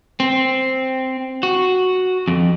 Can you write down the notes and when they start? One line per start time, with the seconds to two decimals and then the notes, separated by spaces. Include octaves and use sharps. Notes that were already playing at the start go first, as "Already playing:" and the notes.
0.20 C4
1.43 F#4
2.28 F2